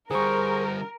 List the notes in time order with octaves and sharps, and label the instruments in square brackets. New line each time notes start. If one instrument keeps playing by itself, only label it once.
[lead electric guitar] D3 G3 [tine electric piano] G#4 C#6 [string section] A#4 [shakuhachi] C5